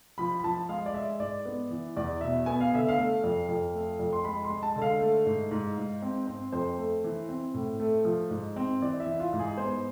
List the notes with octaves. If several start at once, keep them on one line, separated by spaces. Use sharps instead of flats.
F3 B5
B5
F3 A5
G#3 F5
D5
G#3 E5
G#2 D5
B3
E3
E2 D5
B2 E5
B3 G#5
F5
D3 E5
F5
A3
F2
F2
A3
F2
C6
G#3 B5
C6
G#3
A5
D3
F5
A3
G#2
G#2
G#2
C4
C4
F2 C5
A3
E3
C4
A2
A3
F3
G#2
C4
E3 D5
E5
E3
F4
G#2
G#4
B3 C5